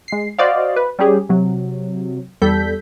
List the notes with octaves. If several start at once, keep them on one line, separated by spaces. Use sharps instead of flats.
G#3 C7
F#4 C5 D5 D#5 F5
B4
G3 C#4 G4 G#4
C3 F#3
E2 G3 A4 G6 B6